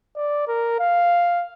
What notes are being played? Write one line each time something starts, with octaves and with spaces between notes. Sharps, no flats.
D5
A#4
F5